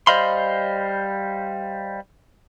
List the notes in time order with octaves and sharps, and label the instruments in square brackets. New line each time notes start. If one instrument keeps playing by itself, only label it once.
[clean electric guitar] G3 C5 D#5 F5 B5 C6